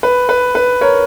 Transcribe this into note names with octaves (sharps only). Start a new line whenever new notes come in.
B4
B4
B4
A#4 C#5